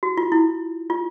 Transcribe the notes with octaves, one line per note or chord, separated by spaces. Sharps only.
F#4
F4
E4
F4